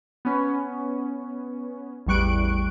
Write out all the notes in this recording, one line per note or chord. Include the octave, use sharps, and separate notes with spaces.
B3 C#4
A1 E2 G3 C#6 F#6 D7